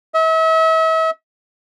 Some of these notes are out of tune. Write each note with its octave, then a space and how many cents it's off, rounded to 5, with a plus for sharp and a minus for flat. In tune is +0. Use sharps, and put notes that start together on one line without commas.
E5 -40